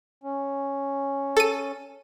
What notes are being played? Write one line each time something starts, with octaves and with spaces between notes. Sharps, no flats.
C#4
A4 D#7